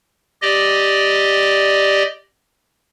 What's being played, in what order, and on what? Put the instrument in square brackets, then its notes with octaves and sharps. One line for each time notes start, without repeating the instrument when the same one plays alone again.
[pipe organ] G4 D5 D#5